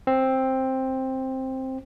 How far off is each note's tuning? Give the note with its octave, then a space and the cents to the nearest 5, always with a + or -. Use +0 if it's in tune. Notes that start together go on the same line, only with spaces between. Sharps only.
C4 +10